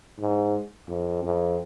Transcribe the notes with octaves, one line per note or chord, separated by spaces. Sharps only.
G#2
F2
F2